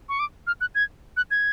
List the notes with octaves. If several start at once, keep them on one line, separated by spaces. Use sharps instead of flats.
C#6
D6
F6
F#6
G#6
F#6
G#6